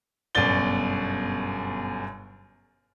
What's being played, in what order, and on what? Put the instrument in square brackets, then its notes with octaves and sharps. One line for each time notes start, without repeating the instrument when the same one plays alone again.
[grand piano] G1 F#2 B2 D5 A6 G7